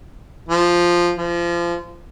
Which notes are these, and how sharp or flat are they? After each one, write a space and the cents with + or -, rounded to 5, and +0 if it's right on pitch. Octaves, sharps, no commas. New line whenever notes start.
F3 +0
F3 -25